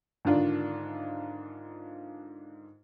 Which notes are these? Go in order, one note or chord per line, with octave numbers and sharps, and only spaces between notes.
G#2 D3 D#3 D4 F4